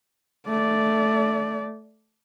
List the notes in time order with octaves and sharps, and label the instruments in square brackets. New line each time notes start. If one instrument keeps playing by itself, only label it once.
[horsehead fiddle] A3 D5